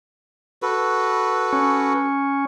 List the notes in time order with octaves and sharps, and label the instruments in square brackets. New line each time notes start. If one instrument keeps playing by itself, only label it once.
[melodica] F#4 A4 B4
[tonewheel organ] C#4